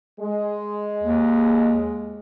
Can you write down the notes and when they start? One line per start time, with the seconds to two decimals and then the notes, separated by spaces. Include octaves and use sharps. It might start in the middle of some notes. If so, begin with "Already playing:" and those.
0.20 G#3
1.03 D#2